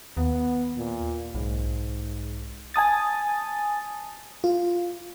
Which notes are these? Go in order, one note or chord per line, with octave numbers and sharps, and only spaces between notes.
D#2 B3
A#2
B1 G#2
G#5 A5 D#6 A6
F4